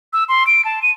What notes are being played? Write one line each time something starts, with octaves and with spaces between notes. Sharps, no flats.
E6
C6
D7
A5
D#7